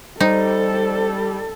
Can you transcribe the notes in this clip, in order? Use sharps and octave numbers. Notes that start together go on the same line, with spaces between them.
G3 D#4 A4 C5